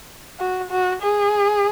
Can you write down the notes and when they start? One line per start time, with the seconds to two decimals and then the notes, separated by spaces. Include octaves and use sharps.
0.39 F#4
0.71 F#4
1.02 G#4